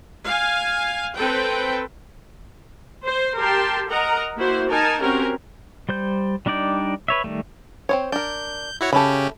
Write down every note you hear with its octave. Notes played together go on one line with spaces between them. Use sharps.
F5 G#5
C4 A4 B4 G5
C5
G4 A#4 G5 A5 C6
A#4 D#5 F#5 A#5
A#3 E4 F#4 C5
D#4 A#4 G#5 A5
C4 C#4 F#4 G4 A#4
G3 C5 G6
G3 D4 D#4 D5 G5
B4 C#5 E5
D#3 G3 A3
C4 C5 C#5
D4 A#4 G6
E4 F#4 C#5
C#3 C#4 G4 A4 E5 B5